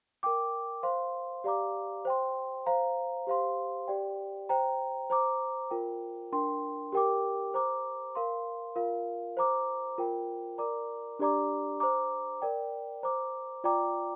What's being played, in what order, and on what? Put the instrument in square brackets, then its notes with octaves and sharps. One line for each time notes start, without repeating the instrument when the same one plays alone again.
[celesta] A#4 G5 D6
C5 F5 C6
G4 D5 F5 A#5 D6
C5 G5 C6
C5 F5 A#5
G4 C5 F5 C6
G4 D5 G5
C5 G5 A#5
C5 A#5 D6
F4 A#4 G5
D4 A#4 G5 C6
G4 A#4 G5 D6
C5 A#5 D6
A#4 F5 C6
F4 A#4 F5
C5 A#5 D6
F4 A#4 G5
A#4 D5 A#5 D6
D4 G4 D5 A#5 D6
C5 A#5 D6
A#4 D5 G5
C5 A#5 D6
F4 D5 G5 A#5 D6